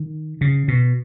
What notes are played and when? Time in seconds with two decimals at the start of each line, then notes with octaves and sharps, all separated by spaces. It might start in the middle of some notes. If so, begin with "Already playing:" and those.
Already playing: D#3
0.41 C#3
0.68 B2